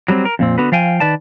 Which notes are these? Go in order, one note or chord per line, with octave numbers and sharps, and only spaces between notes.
F#3 G3 B3 C4
A#4
F2 A#2 C4
D3 B3 F#4 B4
F3 F5 G5 G#5
D#3 B4 D5 A5